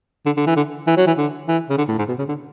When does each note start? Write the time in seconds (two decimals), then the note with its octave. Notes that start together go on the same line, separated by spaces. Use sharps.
0.26 D3
0.37 D3
0.47 E3
0.56 D3
0.87 E3
0.97 F#3
1.07 E3
1.18 D3
1.48 E3
1.69 C#3
1.78 D3
1.88 A2
1.98 G#2
2.08 B2
2.18 C#3
2.29 D3